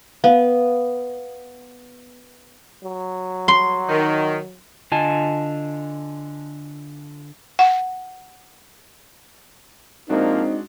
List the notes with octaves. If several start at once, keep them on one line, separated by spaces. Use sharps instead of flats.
B3 F5
F#3
C6
D#3
D3 F4 D#5 G#5 A5
F#5
A#2 F3 G#3 A#3 C4 D4 D#4 F#4